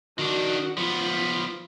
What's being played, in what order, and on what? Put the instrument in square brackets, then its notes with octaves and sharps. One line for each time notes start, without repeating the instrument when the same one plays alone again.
[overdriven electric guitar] D#3 D4 [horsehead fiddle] F#4
[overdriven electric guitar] F3 B3 [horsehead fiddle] F4